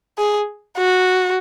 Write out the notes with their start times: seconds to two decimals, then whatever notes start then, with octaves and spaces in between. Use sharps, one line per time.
0.18 G#4
0.78 F#4